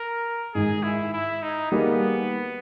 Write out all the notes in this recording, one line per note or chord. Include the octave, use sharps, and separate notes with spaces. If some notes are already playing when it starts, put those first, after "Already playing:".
Already playing: A#4
G#2 D#3 G#3 G#4
E4
E4
D#4
D#3 G3 A#3 B3 D#4 G#4